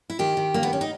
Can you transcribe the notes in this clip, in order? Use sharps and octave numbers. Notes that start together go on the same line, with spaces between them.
E4
D#3 G4
D#3
G2 A#3
B3
C#4
D#4